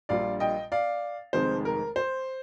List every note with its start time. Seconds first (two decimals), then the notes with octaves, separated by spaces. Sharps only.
0.09 A#1 A#2 G3 D4 F4 D5 F5
0.40 D#5 G5
0.72 D5 F5
1.33 F1 F2 D#3 G#3 C5
1.65 A#4
1.96 C5